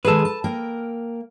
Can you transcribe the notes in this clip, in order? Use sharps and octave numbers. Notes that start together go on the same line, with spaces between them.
D#3 G#3 G#4 A4 B4
A5
A#3 A#4 G5